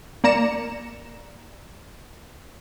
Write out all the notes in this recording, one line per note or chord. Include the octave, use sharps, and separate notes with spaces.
A#3 D5 A#5 C#7 E7